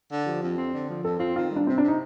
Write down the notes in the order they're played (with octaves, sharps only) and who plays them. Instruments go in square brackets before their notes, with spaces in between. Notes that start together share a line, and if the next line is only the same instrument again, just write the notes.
[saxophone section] D3
[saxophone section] F3 [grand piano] G4
[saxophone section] F2
C4
D3
F3
[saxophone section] F2 [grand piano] A4
[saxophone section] C4 [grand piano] F4
[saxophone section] D#3 [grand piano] F4
[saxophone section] G3
[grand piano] D4
[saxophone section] C3 [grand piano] C4
[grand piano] D4
[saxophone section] C3
[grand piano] D#4